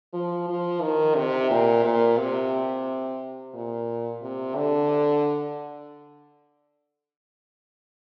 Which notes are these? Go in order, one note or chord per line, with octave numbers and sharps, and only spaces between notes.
F3
F3
D#3
C3
A#2
A#2
C3
A#2
C3
D3